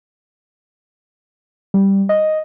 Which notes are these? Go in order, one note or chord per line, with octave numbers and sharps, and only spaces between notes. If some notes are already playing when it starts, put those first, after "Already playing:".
G3
D#5